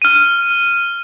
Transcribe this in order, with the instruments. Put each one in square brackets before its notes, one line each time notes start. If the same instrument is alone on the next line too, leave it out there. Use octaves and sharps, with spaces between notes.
[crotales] F6 D#7